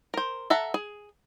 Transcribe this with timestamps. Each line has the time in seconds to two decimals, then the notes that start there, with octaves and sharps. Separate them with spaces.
0.14 A#4 C5
0.50 A4 E5 F#5 A#5
0.74 G#4